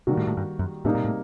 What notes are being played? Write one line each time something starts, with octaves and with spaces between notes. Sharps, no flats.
C3 D#3 G3 A#3 F#4
A2
A2
G2
F#2
A2 C3 G3 A#3 D#4
A#2
A2